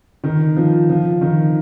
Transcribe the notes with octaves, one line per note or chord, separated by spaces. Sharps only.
D#3
F3
F3
D#3